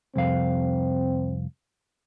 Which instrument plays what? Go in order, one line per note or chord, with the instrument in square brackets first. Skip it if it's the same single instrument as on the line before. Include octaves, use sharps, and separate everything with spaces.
[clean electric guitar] C2 F2 F5 [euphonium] C4